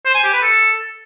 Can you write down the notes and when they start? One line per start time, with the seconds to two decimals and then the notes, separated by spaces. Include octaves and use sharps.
0.06 C5
0.15 G#5
0.24 G4
0.33 B4
0.42 A4